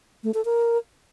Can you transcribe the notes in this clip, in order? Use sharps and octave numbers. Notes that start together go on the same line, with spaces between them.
A3
A4
A#4